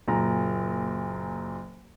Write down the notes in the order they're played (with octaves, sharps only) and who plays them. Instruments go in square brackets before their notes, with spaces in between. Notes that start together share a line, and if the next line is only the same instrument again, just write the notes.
[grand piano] F#1 A#2 A#5